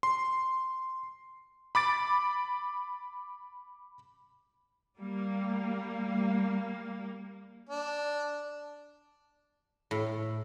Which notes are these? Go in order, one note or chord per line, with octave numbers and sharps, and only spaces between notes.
C6
B5 D6 A6 D7
G3 A#3
D4
A2